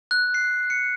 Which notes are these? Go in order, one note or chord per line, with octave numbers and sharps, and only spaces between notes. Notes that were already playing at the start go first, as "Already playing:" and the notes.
F#6
C7
C#7